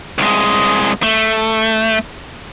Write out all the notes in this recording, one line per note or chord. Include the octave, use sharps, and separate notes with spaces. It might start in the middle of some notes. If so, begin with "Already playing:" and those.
C2 G#3
A3